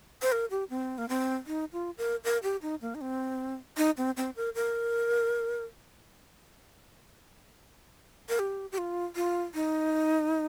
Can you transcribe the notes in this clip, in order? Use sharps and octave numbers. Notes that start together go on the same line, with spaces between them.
C5
A#4
G4
C4
A#3
C4
D#4
F4
A#4
A#4
G4
D#4
A#3
D#4
C4
D#4
C4
C4
A#4
A#4
A#4
G4
G4
F4
F4
D#4